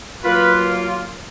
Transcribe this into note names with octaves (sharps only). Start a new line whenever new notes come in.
F#3 A#3 F4 B4